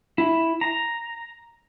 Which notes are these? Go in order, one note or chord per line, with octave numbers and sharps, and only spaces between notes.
E4
A#5